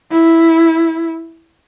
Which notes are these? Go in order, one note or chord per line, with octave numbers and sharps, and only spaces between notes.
E4